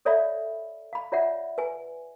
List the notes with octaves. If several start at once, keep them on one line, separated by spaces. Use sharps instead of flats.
A4 C#5 D5 E5 F5 B5
F5 B5
F4 C#5 D5 E5 F#5
B4 G#5